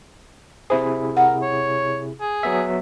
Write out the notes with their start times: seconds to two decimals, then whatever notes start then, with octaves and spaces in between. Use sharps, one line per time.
0.70 C3 E4 G#4 C5
1.17 A#4 F#5
1.42 C#5
2.21 G#4
2.43 F#3 B3 E5